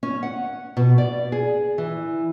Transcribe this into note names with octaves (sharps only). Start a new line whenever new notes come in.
C#4
F#5
B2
D5
G#4
E3